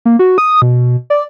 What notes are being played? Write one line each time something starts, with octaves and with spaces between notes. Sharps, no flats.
A#3
F#4
D#6
B2
D5